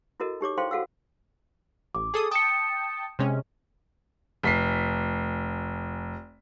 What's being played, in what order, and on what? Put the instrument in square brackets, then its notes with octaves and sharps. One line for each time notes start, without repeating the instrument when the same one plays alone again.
[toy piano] E4 F#4 A4 A#4 D#5
D#4 G4 C#5 D6
E4 A4 C5 F5 G5 C6
F#4 A4 F5 F#5 E6
[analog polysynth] A1 [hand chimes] D6
[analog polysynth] G#4 A4 D#6
[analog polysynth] G5 A5 [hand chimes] D#6 C#7
[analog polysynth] C3 G#3 C#4
[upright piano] F1 B6 C7